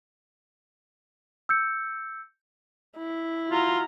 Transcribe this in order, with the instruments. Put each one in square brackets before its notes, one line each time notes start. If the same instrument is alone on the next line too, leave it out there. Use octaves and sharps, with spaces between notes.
[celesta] E6 G6 C#7
[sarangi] E4
[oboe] F4 [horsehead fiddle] F#4 A#5